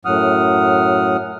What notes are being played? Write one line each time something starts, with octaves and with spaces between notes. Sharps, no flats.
F#2 A2 F#3 F#5 D#6 F6